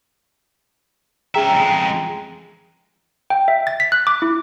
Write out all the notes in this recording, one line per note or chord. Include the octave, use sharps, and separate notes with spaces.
C#4 G#4 E5 G5 A#5
F2 G#3
G5
E5
A6
B6
F#6
D6
E4